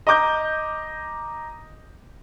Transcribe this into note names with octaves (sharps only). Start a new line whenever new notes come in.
D#5 A#5 D6 G6